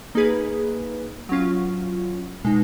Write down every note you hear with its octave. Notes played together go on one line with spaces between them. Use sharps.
A#3 D#4 G#4 B4
F#3 C#4 F4
B2 G#3 D#4